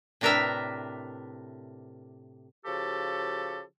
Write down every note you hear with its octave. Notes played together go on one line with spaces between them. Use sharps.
A2 C3 D4 A#4 B4 E5
C#3 F3 F#4 G4 A4